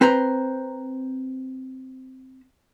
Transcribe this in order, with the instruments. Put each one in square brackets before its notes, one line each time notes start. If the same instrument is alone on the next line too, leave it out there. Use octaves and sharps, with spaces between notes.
[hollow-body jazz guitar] C4 B4 C5 A#5